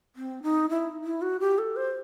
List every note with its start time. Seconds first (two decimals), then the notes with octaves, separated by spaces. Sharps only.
0.16 C4
0.43 D#4
0.70 E4
1.04 E4
1.22 F#4
1.40 G4
1.58 A4
1.76 C5